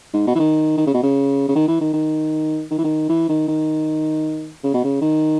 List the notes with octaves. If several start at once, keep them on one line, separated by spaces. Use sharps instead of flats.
G#2
B2
E3
D#3
D#3
C#3
B2
C#3
C#3
D#3
E3
D#3
D#3
D#3
E3
D#3
E3
D#3
D#3
C#3
B2
C#3
D#3